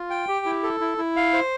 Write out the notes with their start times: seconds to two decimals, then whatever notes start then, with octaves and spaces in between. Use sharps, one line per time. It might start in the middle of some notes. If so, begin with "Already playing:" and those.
Already playing: F4
0.10 G5
0.28 G4
0.46 E4
0.63 A4
0.80 E4
0.98 E4
1.16 F5
1.33 C5